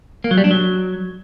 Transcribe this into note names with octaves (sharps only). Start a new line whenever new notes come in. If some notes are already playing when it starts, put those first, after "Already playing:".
A#3
F#3
G3
D4
F#3